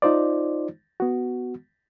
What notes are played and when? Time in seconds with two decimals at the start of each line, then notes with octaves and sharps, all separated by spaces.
0.02 D#4 F4 C5 D5
1.00 B3 F#4